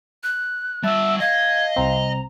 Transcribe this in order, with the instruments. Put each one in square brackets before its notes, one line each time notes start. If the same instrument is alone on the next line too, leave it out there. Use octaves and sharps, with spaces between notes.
[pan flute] F#6
[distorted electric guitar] G3 F#5 [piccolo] E5 [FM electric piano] A5
[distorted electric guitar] D#5 [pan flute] F5 [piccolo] G#6
[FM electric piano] C2 C4 [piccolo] A#5